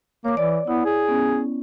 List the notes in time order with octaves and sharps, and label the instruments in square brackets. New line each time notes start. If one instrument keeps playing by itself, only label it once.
[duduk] A#3 [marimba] C#5 D6
[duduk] E3 [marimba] D5
[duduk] B3 [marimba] E4
[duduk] G#4
[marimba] B3 C#4